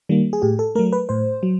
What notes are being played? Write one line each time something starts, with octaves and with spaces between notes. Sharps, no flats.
D#3 G3 A#3
G#4
A2 G4
A4
F#3 A3 A#4
B4
A2 C5
F#3